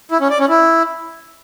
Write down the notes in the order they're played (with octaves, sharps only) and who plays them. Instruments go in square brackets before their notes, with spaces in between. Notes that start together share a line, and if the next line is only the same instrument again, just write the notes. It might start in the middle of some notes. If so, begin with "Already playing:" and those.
[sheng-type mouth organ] E4
C#4
D5
C#4
E4